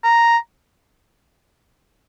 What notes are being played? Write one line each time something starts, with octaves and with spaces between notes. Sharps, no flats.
A#5